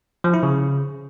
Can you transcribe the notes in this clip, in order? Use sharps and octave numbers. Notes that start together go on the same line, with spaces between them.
F3
E4
C#3